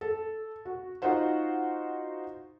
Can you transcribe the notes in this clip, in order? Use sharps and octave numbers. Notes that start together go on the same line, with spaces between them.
A4
F#4
D#4 F4 F#4 C5 F#5